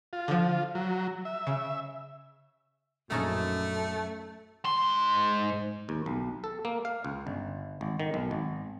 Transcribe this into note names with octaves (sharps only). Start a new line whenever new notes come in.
F4
D3 F3
F#3
E5
C#3
A#1 F#2 A3 C#4 D#4 A4
G#2 C6
D#2
B1
A4
A#3
F5
C#2
G1
G#1
D#3
B1
G#1